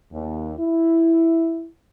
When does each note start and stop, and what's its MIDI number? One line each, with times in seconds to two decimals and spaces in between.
0.12 0.55 39
0.60 1.68 64